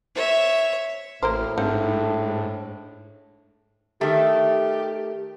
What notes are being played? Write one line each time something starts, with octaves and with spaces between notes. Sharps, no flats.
C#5 E5
A1 A2 A#3 A#4 C5 F6
G#2 C4 D4 F#5
D#3 A3 G4